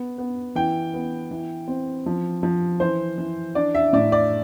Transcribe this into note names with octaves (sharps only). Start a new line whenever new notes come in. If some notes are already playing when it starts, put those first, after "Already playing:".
Already playing: B3
B3
E3 G5
B3
E3
C4
F3
F3
E3 C5
E3
D4 D5
E5
A2 D5
D5